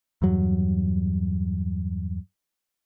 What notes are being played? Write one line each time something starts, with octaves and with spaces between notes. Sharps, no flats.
E2 G2 F#3